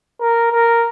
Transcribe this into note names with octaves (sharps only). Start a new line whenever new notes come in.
A#4
A#4